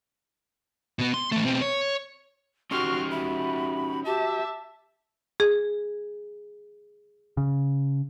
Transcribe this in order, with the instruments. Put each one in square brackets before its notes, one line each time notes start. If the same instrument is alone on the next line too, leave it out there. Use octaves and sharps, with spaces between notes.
[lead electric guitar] B2 B3
C6
E3 A3
B2 C4
C#5
[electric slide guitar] C#4 D#4 G4 [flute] F#4 [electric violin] C6 F6 [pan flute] C#6
[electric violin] F#4 [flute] E5 [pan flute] B5
[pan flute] F#4 [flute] G4 [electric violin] E5 A5
[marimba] G#4
[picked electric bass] C#3